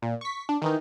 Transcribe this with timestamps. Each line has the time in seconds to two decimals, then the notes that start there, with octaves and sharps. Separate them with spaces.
0.02 A#2
0.21 C#6 B6
0.49 D4
0.62 D#3 E3 D#4